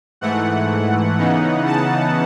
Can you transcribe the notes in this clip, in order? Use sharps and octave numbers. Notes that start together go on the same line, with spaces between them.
G#2 E3 A3 F#5
C#3 E3 B3 D#4
A5